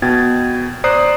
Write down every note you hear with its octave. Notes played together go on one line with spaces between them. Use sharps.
B2 G5 G#6 A6
C5 D5 A#5 D#6 F#6 C7